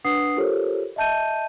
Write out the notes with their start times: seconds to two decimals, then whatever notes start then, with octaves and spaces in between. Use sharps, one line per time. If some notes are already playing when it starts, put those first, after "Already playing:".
0.05 D4 B4 F#5 D#6 C7
0.36 F4 G4 A4 A#4 C5 C#5
0.96 D#5 E5 A5 G6 D#7